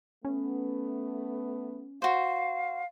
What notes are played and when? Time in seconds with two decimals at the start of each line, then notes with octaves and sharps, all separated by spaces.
0.25 A3 B3 C#4
2.02 F#4 C5 F5